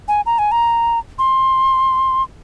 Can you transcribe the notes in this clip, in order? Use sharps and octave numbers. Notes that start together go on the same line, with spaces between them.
G#5
A#5
G#5
A#5
C6